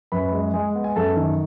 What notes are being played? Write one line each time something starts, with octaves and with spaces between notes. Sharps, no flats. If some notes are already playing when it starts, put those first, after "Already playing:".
F#2 B4 B5
G#3
G#3 G#4 G#5
B3
G#5
F#2 A4 A5
D#3